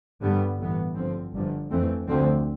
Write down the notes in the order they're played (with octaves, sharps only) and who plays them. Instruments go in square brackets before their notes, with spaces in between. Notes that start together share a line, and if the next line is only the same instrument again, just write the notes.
[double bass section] G2 D3 G3 B3
A1 A2 E3 B3
A1 G2 D3 F3 C4
G1 G2 D3 F3
F2 E3 A3 C4
D2 D3 F3 C4